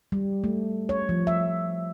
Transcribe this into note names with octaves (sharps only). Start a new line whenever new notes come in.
G3
A3
C#5
F3
E5